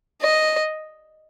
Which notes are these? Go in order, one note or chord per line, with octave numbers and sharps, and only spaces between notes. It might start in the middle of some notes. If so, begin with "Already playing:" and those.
D#5